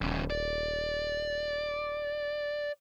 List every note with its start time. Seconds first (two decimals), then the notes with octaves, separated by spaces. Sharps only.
0.01 D#1 E2 C#3
0.30 D5